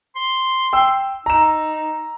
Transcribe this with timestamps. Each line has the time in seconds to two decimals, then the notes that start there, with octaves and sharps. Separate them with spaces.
0.16 C6
0.73 G5 E6
1.26 D#4 A#5 E7